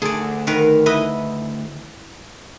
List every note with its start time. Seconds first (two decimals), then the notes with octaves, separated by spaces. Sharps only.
0.02 D2 G#4 A4 D5
0.47 D#3 A#4 B4
0.86 E4 B4 D#5